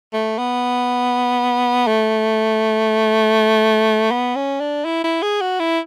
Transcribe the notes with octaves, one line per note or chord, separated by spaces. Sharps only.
A3
B3
A3
B3
C#4
D4
E4
E4
G#4
F#4
E4